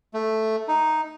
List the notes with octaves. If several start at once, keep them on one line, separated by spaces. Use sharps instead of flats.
A3
D#4